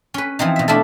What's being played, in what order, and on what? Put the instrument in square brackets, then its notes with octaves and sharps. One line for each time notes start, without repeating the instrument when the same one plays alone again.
[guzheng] C#4 B4
E3 F3 C4 D#4
B2 E5
A3 D4 E4 F4 A4